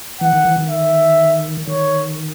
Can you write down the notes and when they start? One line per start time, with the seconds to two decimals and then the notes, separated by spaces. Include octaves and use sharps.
0.21 E3 F#5
0.33 D#3
0.45 E3
0.58 D#3
0.69 E5
1.68 D#3 C#5